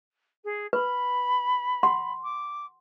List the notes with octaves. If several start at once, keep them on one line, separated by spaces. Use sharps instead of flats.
G#4
B4 B5
F#5 C6
D6